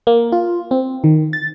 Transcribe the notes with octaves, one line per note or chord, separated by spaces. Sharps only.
A#3
F4
C4
D#3
A6